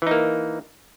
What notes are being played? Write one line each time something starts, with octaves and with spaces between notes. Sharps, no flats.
E3 A#3 D#4